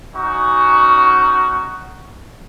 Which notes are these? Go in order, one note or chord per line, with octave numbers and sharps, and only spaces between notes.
C#4 D#4 F#4